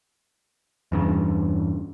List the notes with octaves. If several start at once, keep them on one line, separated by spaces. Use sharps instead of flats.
E2 G2 C#3